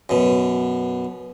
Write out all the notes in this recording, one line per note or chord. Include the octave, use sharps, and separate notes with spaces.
F#2 B2